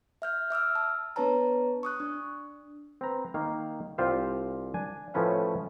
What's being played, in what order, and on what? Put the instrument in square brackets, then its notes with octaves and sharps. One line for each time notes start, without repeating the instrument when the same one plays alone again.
[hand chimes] E5 F6 G6
E5 D6 E6 F6
A5
B3 D4 B4 C#5 A5 A#5
C#6 D#6 F#6
D4
[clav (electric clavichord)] C4 B4 A#5
D#3 A#3 F5
C2 C4 F4 G4 C5 F5
D4 G#5
A2 F3 A3 C#4 B4 F5